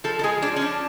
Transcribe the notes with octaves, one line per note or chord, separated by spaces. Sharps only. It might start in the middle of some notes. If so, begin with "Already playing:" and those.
F3 A4
A4
G#3 G#4
F3 D4
C#4
F3 D4